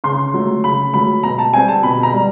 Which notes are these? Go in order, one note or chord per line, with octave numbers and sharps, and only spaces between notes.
C#3 C6
F#3 A3
C#3 B5
F#3 A3 B5
B2 A#5
A5
G3 C4 G#5
A5
B2 B5
A#5
G3